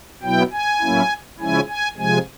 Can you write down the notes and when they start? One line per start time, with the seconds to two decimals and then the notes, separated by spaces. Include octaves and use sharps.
0.22 B2 F#3 B3 E4 G5
0.52 G#5
0.80 A2 F#3 A#3 C#4 E4
1.39 C#3 F3 G#3 C#4 E4 G#5
1.68 G#5
1.98 C3 F3 G#3 G#5